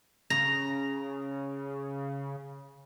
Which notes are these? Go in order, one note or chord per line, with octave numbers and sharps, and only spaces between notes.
C#3 A#5